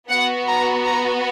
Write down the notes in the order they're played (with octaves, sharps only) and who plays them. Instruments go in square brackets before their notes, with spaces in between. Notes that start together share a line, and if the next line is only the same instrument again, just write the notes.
[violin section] B3 F#4 F#5
A#5
A#5